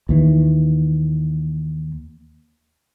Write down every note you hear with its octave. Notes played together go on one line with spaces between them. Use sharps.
D#2 E3